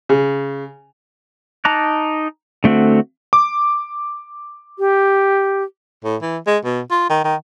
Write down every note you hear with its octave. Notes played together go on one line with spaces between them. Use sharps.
C#3
D#4 A5 A#5 D6 F#6
D3 A3 C4 F#4
D6
G4
A2
E3
G#3
B2
F4
D#3
D#3